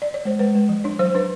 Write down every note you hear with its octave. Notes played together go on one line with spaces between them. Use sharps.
D5
C#5
G#3 C5
G#3 B4
G#3
F3
D4 C#5
F#3 C5
D4 B4